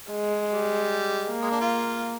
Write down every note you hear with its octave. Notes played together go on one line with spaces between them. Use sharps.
G#3
G3
A#3
G#3
D4
F4